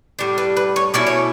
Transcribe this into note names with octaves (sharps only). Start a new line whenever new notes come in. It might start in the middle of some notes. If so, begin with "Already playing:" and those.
A2 G3 D4
B4
B4
C#5
B2 A3 C#4 E4 D5
C#5